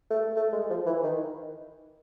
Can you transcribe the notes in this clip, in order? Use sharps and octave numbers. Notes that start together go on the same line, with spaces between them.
A3
A3
G#3
F3
E3
D#3